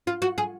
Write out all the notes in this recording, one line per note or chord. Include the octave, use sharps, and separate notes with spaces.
F4
F#4
G#4